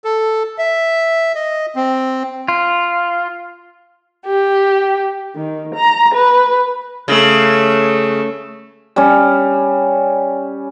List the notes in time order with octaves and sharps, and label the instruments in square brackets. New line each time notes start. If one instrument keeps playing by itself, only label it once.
[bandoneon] A4
E5
D#5
C4
[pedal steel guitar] F4
[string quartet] G4
D#3
A#5
B4
[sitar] C#3 [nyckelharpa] A3
[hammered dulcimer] G3 C#4